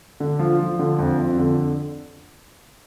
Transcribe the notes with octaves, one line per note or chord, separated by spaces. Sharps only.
D3
F3
F3
D3
F2
F2
D3